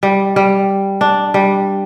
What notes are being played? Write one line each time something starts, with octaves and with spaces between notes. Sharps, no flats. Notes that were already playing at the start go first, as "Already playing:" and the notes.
G3
G3
D4
G3